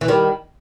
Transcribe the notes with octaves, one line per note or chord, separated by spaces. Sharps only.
E3
D#3 G3